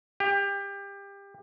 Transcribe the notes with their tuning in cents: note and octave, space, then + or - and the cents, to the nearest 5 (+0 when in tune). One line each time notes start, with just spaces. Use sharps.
G4 +25